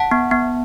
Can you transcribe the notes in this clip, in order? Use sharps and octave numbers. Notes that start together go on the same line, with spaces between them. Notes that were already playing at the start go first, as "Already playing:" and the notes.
Already playing: F#5 A5
B3
B3